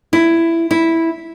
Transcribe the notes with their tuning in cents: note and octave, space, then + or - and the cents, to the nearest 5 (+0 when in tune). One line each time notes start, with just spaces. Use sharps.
E4 +10
E4 -5